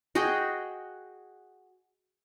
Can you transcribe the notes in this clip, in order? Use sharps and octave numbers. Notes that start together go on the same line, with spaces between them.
F#4 G#4 D#5 G5